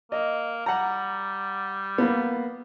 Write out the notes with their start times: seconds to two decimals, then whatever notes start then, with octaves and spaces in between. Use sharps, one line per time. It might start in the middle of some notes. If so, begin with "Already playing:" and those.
0.12 A#3 D#5
0.66 G3 F#5 A#5
1.98 A#3 B3